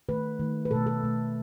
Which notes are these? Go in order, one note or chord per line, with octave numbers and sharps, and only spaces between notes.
D#3 A3 B4
D#3 A3
B4
B2 A3 A4
A4
B2 A3